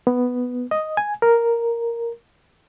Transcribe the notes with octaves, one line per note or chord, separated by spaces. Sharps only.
B3
D#5
G#5
A#4